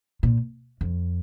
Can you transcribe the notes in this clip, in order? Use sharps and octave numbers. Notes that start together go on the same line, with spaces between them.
A#2
F2